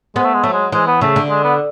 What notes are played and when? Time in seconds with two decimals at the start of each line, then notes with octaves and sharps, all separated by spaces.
0.16 G#3 B3
0.24 A3
0.34 G#3
0.44 F#3 A3
0.53 G#3
0.72 E3 G#3
0.87 B3
1.01 C#3 A3
1.16 D3
1.30 G#3
1.44 B3